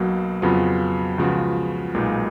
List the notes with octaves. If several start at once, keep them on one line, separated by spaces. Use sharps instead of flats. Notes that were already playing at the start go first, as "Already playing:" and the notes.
Already playing: B1 B2 F#3 A#3
F2 C#3 F#3 B3 F4
C#2 C#3 F3 B3 F#4
B1 A#2 G#3 B3 D#4